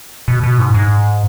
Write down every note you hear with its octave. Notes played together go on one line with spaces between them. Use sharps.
B2
B2
G#2
G#2